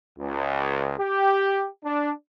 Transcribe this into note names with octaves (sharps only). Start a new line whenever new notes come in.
C#2
G4
D4